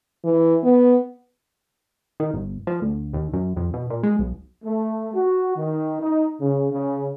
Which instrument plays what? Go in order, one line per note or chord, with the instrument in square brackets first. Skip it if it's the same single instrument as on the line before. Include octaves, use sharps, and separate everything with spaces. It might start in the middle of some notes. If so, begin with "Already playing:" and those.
[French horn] E3
B3
[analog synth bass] D#3
G1
F3
D2
D#2
F#2
F2
B2
A#2
G#3
B1
[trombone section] A3
F#4
D#3
D#4
C#3
C#3